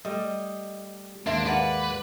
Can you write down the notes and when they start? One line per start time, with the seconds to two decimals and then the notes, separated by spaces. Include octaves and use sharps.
0.05 G3 A3 D#5
1.27 D#2 G#2 A#3 D4 E5 C6
1.46 B4 D5 F5 F#5